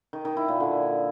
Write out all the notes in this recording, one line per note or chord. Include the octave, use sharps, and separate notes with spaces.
D#3
D#3
E4
A#2
D3